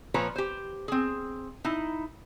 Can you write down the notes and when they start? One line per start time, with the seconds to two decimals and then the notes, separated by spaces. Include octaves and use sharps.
0.14 A#2 F3 B4 C#5 A#5
0.36 G4 C5
0.88 C4 G#4
1.64 D#4 E4